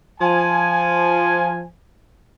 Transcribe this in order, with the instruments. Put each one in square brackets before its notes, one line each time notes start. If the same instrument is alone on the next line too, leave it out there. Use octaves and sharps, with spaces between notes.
[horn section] F3 G#5